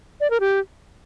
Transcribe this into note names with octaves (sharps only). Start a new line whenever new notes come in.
D5
A#4
G4